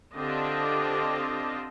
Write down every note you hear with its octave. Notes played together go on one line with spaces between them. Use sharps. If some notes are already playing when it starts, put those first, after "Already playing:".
D3 C4 D4 F4 G4 D#5